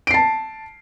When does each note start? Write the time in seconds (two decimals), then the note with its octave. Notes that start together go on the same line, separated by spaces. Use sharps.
0.07 D7
0.11 C7
0.14 A5